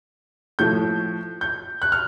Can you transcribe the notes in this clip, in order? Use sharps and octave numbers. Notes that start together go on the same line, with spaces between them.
A2 F3 A3 G6
G6
F#6
F6